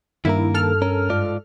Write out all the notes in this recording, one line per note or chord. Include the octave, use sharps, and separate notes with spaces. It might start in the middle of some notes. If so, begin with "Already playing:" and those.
G2 D#3 A#3 E4 A#4
A4 F6
C#4 A#4
G#2 F4 D5